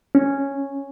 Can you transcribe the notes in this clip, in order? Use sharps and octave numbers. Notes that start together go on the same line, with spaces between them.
C#4